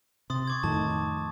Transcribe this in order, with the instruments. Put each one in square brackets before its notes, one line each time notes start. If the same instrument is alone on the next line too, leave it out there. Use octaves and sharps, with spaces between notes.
[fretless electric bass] C3 [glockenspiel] C6 D#6 A6
[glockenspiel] C#6 D6 G#6
[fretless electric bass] F2 A2 D#3 [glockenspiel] A5